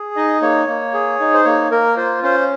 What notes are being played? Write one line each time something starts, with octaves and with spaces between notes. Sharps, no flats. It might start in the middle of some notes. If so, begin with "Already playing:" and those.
Already playing: G#4
D#4 D#5
A#3 C#5
A#3
G#4
D#4
C5
A#3 C#5
A#3 A#4
F4 C5
C#4 C5